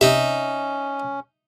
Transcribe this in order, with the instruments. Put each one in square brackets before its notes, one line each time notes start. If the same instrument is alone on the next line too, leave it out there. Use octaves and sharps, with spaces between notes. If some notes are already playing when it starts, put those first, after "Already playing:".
[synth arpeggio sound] C3 [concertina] C#4 [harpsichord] D#4 E5